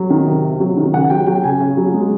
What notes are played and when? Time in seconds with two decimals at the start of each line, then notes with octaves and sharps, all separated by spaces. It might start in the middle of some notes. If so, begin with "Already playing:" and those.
Already playing: F#3
0.10 D#3
0.27 C3
0.44 C3
0.60 F#3
0.77 D#3
0.93 C#3 F#5
1.10 F#3 G5
1.27 F#3 G5
1.44 C#3 G#5
1.61 C#3
1.77 F#3
1.94 G#3